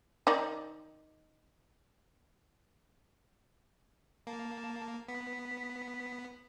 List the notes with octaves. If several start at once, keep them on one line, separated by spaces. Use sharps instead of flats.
D#3 D#4 D5
A#3 A5
B3 B6